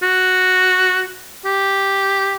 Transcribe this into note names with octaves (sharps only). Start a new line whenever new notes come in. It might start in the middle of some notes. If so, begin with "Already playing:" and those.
F#4
G4